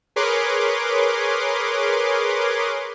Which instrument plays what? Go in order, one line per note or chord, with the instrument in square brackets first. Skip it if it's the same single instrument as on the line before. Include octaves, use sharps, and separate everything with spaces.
[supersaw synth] G#4 A#4 B4 C#5 C6 D6